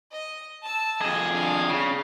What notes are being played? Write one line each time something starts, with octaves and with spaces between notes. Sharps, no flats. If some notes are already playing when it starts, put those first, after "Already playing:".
D#5
A5 E6
F2 G#4 D#5
D4 F5
C#3